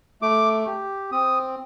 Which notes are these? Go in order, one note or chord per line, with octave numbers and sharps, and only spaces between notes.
A3 D6
G4
C4 D#6